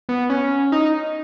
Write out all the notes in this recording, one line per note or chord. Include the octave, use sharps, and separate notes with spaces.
B3
C#4
D#4